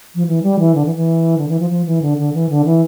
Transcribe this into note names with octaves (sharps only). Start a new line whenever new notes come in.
F3
E3
G3
E3
D3
E3
E3
D3
E3
F3
F3
E3
D3
D3
E3
D3
E3